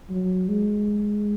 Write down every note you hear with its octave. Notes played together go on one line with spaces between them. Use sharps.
F#3
G#3